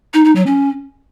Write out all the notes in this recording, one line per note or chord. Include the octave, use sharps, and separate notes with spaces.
D#4
D#4
F#3
C#4